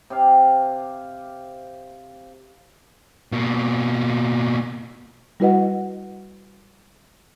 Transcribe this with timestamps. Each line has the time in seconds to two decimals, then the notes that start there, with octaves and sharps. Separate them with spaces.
0.10 C3 G4 F5
3.32 B2 A#3
5.40 G3 E4 F#4 B4 D#5 F#5